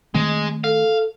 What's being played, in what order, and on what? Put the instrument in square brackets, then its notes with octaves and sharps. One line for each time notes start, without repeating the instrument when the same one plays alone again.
[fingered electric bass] D#3 A3 C4 [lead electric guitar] G#3
[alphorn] A4 [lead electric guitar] F5